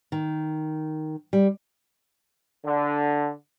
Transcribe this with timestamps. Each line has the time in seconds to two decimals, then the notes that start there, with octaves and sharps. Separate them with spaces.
0.12 D#3
1.33 G3
2.64 D3